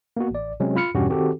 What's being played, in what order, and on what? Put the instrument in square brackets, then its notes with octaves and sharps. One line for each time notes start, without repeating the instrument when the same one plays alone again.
[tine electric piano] A#3 B3 F#4
A1 D5
C3 F#3 G#3 C4 C#4
F4 B5 F6 C#7
E2 G2 B2 C#4 F#4 G4
D#3 C4 F#4 G4 A4